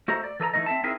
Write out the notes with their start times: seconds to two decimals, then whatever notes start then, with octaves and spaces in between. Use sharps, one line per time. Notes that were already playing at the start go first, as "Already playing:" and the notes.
0.08 A3 F#4 A4 C5 D#5 A#5
0.24 D5
0.40 E3 A4 D#5 A#5
0.54 E3 G3 A3 D#4 D#5
0.66 C4 E5 A5
0.83 C4 D#4 E4 G#4 A#4 E5